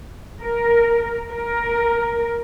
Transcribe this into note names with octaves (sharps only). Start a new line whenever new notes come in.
A#4
A#4